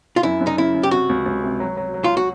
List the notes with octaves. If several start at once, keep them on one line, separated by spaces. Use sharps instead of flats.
F4
F#2 E4
F#2
D#4
C#3 E4
C#3
G4
C3 F#4
C#2
C#2
C3
F#3
F#3
F#3
F4
F#4